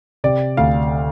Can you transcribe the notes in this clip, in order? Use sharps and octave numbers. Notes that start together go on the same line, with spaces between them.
C3 D5
D2 F5